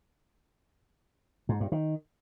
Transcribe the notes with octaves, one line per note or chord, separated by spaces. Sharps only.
G#2
G2
D#3